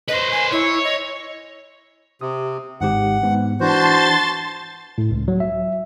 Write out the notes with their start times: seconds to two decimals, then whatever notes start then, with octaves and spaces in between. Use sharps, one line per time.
0.08 B4 C5 D#5
0.31 G#5
0.52 E4 C#5
0.84 D#5
2.21 C3 D#6
2.81 G#1 G#2 G4 F#5
3.23 G#2 B3
3.60 E3 D4 F#4 C5 A5 C6 A6
4.98 A2
5.11 C#2
5.28 F#3
5.40 E5